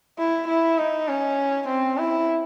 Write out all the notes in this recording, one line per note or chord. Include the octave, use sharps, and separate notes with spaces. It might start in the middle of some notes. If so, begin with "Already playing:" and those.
E4
E4
D#4
C#4
C4
E4